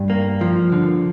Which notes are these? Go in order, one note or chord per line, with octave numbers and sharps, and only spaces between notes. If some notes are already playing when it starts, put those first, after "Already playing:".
Already playing: G2
A#3
F3
D3